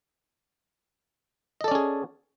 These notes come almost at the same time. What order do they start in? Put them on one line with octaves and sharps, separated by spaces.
D#5 A4 D5 C#4 G#4